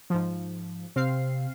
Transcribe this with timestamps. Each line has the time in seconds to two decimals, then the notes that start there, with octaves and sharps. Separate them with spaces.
0.10 G#2 F3
0.96 C3 C4 F5 C7